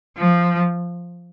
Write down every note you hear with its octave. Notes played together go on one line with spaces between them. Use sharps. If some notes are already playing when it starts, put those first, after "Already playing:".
F3